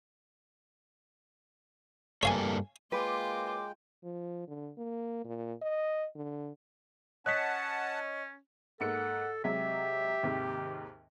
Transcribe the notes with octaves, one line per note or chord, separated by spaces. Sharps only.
G2 A#3 A4 C#5 F5 G#5
F#2 G#3 A#3 F4 B4 G5 D6
F3
D3
A#3
A#2
D#5
D3
C#4 C#5 D#5 F#5 A5 C#6 F#6 B6
G#2 A#3 A4 F#5 C#7
C3 F#3 G#3 G4 E5
D#2 G#2 C3